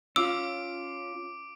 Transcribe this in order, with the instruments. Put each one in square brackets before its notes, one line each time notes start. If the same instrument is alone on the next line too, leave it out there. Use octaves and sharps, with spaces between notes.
[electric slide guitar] C#4 F4 [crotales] D6 D7 [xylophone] E6